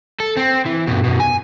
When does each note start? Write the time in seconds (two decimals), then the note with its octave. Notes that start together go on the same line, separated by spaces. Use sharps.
0.20 A4
0.37 C4
0.66 E3
0.88 G2 B2
1.04 F#2 B2
1.20 G#5